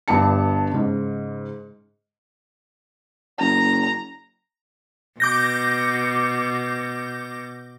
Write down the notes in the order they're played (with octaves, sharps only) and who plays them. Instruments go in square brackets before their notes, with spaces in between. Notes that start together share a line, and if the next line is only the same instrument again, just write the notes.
[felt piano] G1 G2 G4 A5 C#7
G#2 C#3
[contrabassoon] F#1 [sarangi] A#5
[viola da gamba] B2 [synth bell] D6 G6 A#6